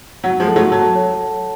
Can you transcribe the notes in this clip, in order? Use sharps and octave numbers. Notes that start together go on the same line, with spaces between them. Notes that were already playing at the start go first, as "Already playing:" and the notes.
F#3 F#5
F3 G#3
A4
F#3 A3
F#3 A5
C#5